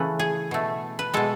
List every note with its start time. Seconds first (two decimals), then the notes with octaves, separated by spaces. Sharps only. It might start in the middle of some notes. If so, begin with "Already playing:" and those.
Already playing: C#3 E3 A3 B4
0.19 G#4
0.51 B2 A3
0.99 B4
1.14 B2 G#3 A4